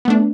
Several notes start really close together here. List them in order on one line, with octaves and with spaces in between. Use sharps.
B3 A3 D4